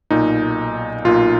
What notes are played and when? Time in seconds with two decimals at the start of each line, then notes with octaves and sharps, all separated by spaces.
0.11 B1 A#2 D#4
1.04 B1 A#2 F4